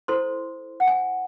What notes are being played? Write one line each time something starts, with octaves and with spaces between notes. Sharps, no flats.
E4 A4 C5 C6
F#5
G#5